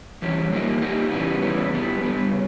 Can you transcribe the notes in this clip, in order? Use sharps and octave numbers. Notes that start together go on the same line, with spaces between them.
E3 G3 C#4 G4
A#2 A#3 D#4 G4
A#2 A#3 D#4 G4
C#3 E3 G3 B3
C#3 E3 G3 B3
G2 G3 B3
G2 G3 B3
C#3